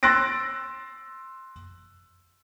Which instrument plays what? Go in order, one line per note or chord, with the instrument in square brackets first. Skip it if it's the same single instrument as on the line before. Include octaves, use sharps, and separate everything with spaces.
[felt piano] C6 E6 F#6 A6 A#6 D7